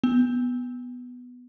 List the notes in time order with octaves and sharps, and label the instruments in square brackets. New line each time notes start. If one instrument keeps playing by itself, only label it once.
[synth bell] B3